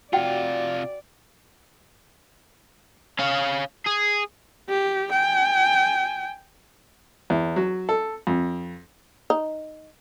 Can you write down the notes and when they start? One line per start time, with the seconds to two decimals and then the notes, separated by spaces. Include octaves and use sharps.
0.13 C3 F4 F#4 D5 F#5 G5
3.19 C#4 F5
3.87 G#4
4.69 G4
5.12 G5 G#5
7.30 E2
7.56 F#3
7.89 A4
8.27 F2
9.30 D#4